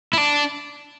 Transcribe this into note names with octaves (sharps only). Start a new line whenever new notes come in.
E4
D4